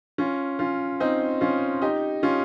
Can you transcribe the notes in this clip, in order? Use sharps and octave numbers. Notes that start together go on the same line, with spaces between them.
C#4 F4
C#4 F4
C4 D#4
C#4 F4
D#4 G4
C#4 F4